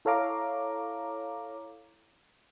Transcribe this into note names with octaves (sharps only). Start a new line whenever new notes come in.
E4 A4 C#5 F5 A#5 D6